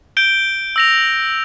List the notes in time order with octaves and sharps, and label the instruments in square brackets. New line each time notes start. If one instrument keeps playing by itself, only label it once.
[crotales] G6 D7 G7
E6 A#6 F7